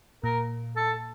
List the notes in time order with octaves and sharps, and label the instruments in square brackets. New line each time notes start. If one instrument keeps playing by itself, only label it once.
[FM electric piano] A#2 [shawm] A#4
[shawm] A4